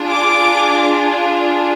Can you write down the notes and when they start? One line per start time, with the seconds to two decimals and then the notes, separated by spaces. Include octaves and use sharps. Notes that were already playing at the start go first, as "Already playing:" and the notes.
Already playing: D4 F4 G#4
0.10 D6